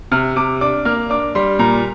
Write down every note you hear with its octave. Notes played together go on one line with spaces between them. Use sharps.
C3 F6
C3 D6
D4 D6
A#3 F6
D4 D6
G3 C6
A#2 A#5